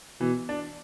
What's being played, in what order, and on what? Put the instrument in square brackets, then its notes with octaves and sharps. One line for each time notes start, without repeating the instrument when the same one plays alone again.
[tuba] B2 [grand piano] E3
[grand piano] D4